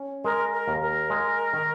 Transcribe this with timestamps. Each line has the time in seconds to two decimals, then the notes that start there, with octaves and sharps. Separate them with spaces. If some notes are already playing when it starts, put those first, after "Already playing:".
Already playing: C#4
0.24 G#3 A#4
0.53 A#4
0.68 D#2
0.82 A#4
1.10 G#3
1.53 D#3